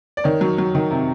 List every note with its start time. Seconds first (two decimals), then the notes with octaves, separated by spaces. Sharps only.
0.17 D5
0.24 D#3 C#5
0.41 F#3
0.58 F#3
0.75 D#3
0.91 C3